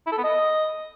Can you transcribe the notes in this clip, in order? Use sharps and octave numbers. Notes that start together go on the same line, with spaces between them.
E4
A4
B3
D#5